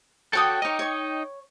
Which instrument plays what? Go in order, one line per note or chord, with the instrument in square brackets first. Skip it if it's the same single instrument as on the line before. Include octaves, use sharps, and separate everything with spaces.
[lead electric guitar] F#4 A4 [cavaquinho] C#5 G#5 D#6 [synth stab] G5 D6
[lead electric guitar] D#4 D#5 [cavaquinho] A#4 C#5
[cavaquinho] C#5 C#6